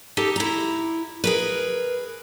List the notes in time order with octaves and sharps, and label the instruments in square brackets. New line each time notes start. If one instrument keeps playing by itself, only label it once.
[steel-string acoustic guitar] D#4 G4 A4
E4 A#5
G#4 A#4 B4